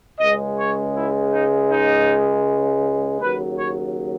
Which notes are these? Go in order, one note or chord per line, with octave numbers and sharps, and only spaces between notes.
C#2 C#3 G#3 D#5
C#5
E4
D#4
D#4
D#2 C#3 F#3 B4
C#5